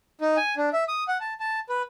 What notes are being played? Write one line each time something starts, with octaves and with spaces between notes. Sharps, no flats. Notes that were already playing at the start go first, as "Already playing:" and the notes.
D#4
G#5
D4
E5
D#6
F#5
A5
A5
B4